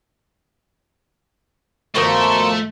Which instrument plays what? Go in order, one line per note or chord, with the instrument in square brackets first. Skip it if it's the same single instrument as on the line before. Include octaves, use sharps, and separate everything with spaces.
[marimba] G2 D#3 [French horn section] B2 F3 [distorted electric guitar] A3 [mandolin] A#4 C5 C#5